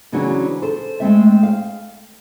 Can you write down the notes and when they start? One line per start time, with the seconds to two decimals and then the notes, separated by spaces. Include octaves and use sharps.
0.12 C#3 E3 F#3 C4 D4 F#4
0.62 A4 C5
1.00 G#3 A3 C4 E5
1.43 F5